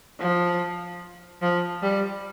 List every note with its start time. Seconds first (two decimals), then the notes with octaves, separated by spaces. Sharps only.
0.20 F3
1.42 F3
1.82 G3